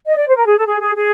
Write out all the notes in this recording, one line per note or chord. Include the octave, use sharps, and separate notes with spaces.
D#5
D5
C5
A#4
G#4
A4
G#4
G#4
G#4